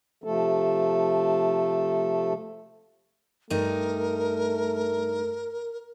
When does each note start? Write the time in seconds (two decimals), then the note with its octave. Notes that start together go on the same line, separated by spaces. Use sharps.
0.24 C3 F3 A3 A4
3.50 G2 A3 D#4 A#4